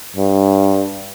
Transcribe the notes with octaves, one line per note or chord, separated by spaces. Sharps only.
G2